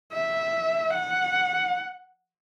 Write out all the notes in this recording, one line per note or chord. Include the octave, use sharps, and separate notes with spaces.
E5
F#5